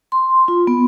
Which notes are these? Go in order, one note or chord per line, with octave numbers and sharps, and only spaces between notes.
C6
F4
B3